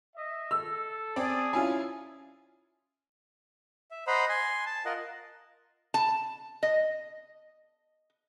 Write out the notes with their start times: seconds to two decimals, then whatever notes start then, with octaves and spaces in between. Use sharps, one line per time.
0.14 D#5 E5
0.51 A4 E6
1.16 C4 G#4 D5 A5 D#6
1.53 C#4 E4 F4 G#5
3.91 E5
4.07 C5 D#5 F#5 A#5 B5
4.29 G#5 C6
4.66 A5
4.85 F4 A#4 D#5 F#5
5.94 A5
6.63 D#5